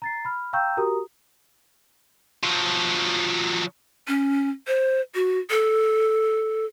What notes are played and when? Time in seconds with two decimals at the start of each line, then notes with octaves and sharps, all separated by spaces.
0.02 A#5 A6 C7
0.25 B5 F6
0.53 F5 G5 A#5 C#6 E6 G6
0.77 F#4 G4 A#4 A#5 D#6
2.43 F3 F#3
4.08 C#4
4.67 C5
5.15 F#4
5.50 A4